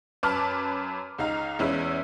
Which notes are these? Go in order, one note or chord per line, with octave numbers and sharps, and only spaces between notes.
F#2 B4 A5 D6 F6
C#2 D#4 F5 A#5
E2 G#3 C#4 E4 B4 E6